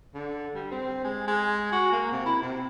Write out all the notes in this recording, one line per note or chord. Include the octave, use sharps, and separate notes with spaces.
D3
G3
C4
G#3
G#3
F#4
A#3
C3
E4
C3